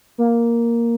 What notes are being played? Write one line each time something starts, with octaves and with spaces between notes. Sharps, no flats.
A#3